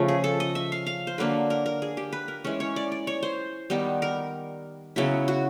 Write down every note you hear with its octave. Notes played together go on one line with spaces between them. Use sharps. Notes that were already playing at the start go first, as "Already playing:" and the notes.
Already playing: C#3 F3 A3
G#4
A4
D#5
E5
F5
F5
C5
D3 F#3 A#3 D4 B4
A#4
A#4
G#4
G4
B4
A#4
E3 G#3 C#4
C#5
D5
D5
C#5
C5
D#3 G3 B3 D#4
A#4
C#3 F#3 B3 E4
F#4